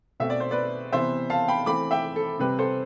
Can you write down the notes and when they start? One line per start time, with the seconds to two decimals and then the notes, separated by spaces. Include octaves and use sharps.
0.20 B2 A3 C4 E5
0.30 D5
0.40 C5
0.51 B4 D5
0.92 C3 E3 B3 C5 E5
1.30 F5 A5
1.48 G5 B5
1.66 E3 A3 C4 B5 D6
1.91 E5 G5
2.16 A4
2.39 C3 G3 C4 B4
2.59 A4 C5